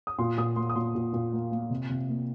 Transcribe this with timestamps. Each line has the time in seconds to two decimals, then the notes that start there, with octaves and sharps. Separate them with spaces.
0.07 D#6
0.18 A#2 C6
0.37 A#2 D#6
0.56 A#3 C6
0.70 D#6
0.75 A#2 C6
0.95 A#2
1.13 A#2
1.33 A#3
1.52 A#3
1.70 C3
1.89 C3
2.09 A#3